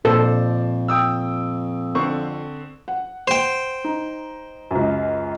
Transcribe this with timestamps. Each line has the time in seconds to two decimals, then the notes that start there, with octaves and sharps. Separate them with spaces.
0.05 F2 A#2 A4 C5 D5
0.88 G5 D#6 E6
1.95 D3 C4 C#6
2.88 F#5
3.28 C5 G5
3.84 D#4
4.71 C#2 F#2